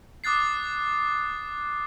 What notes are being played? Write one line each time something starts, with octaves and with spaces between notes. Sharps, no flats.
D6 D#6 F#6 A6 C7